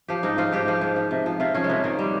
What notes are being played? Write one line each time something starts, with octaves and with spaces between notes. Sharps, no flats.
F3 G4
G#2 D#4
F3 F4
G#2 G4
F3
G#2
F3
C3
F3
C3 F4
F3 C#4
G#3
C3 A#3
D#3
G3